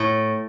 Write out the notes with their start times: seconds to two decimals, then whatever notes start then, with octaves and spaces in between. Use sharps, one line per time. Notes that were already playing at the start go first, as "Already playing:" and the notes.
Already playing: A2